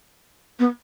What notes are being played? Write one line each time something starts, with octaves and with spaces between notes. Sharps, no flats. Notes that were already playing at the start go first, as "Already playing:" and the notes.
B3